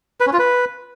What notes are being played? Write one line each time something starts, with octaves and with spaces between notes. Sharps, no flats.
B4
C#4
F4
B4